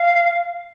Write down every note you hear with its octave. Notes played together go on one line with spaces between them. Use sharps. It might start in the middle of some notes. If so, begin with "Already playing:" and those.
Already playing: F5